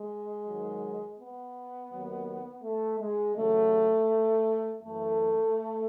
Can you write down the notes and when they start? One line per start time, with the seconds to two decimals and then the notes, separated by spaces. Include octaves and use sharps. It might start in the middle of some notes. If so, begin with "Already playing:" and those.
Already playing: G#3
0.45 G#2 D#3 F#3
1.17 B3
1.90 D#2 D#3 F#3
2.63 A3
3.00 G#3
3.36 E2 C#3 F#3 A3
4.82 F#2 E3 A3